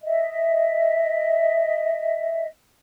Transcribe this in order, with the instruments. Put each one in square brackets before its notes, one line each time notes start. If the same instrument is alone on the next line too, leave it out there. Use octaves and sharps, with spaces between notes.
[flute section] D#5 E5